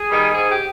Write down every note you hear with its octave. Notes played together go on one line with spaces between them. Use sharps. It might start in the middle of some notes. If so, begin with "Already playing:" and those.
Already playing: G#4
D#3 G3
G#2 G#4
G4